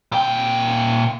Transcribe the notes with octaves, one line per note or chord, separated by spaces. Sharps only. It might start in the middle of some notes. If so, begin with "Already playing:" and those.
A#2 G5